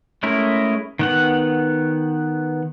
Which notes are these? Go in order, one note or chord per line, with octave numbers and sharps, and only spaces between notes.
G#3 A3 C#4 E4 A#4
D#3 B3 F#5